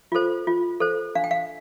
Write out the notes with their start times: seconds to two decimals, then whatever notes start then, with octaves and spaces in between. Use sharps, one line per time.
0.12 F4 A4 C5
0.47 F4
0.80 A4 C5
1.15 D4 F5
1.24 G5
1.31 F5